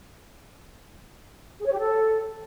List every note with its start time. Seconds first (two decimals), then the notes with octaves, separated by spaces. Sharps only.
1.60 G#4
1.66 C#5
1.73 G4
1.79 A4